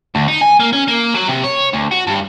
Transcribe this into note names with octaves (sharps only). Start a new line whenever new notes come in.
D2
D#4
G#5
A#3
C#4
A#3
F#3
C3
C#5
D2
F#4
G2